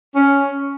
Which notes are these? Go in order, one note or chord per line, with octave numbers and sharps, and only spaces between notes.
C#4